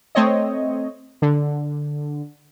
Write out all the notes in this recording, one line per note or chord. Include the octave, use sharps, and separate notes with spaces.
A3 C4 C#5 D#5
D3